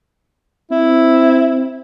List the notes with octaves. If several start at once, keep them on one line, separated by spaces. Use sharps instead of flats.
C4 E4